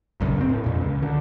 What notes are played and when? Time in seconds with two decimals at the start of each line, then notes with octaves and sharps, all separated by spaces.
0.20 A#1 F#2 C#3
0.37 E1 C4
0.49 A2
0.64 F2 A#2
0.81 C#2
1.02 D3